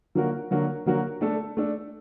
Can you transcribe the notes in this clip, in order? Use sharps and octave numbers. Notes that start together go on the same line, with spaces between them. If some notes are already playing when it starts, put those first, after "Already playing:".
D3 F#3 A#3 F#4 A#4
D3 F#3 A#3 F#4 A#4
D3 F#3 A#3 F#4 A#4
A3 D4 A4
A3 D4 A4